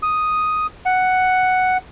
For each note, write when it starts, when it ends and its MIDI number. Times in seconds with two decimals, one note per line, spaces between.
0.03 0.67 87
0.86 1.77 78